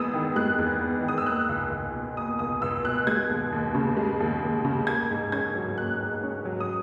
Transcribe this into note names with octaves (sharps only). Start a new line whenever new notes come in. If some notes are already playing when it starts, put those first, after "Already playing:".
Already playing: E2 G#3 B3 D#6 E6
D#3
G#3 F#6
E2
B3
D#3
D#6
E6
A#3 F#6
C#2
C#2
B2
A#3 D#6
C#2 D#6
C#2 E6
B2 F#6
G#3 G#6
D#2
D#2
C#3
G#3
D#2
D#2
C#3
A#3 G#6
G#2
C#4 G#6
F#3
A#3 F#6
G#2
C#4
F#3
D#6